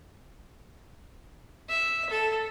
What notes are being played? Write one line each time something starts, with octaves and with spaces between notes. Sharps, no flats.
E5
A4